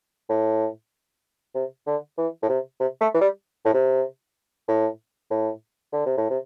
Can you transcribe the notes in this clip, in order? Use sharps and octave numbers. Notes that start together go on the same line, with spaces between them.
A2
C3
D3
E3
A2
C3
C3
A3
E3
G3
A2
C3
A2
A2
D3
C3
A2
C3